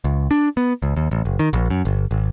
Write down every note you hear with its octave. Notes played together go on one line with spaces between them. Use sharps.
C#2
D4
B3
C#2
D#2
A1
F#1
D#3
A#1
F#2
G1
G#1